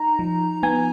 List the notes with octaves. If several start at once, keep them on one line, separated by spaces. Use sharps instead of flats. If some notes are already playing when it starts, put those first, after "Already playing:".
Already playing: D#4 A#5
F3
B3 G#5